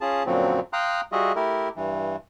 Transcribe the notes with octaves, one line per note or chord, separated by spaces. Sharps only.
C#4 F4 G#4 A5
F#2 A#2 D3 F3 F#3 C4
F5 G5 A#5 C6 D#6 F#6
G3 F4 F#4 G#4 D#5 E5
A3 E4 G4 A#4
G2 E3